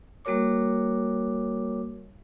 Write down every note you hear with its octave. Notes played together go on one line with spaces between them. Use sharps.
G3 A#3 F#4 A#4 C#5 D6